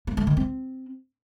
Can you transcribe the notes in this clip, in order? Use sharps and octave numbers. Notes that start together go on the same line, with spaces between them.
A#3
A3
D#3
C4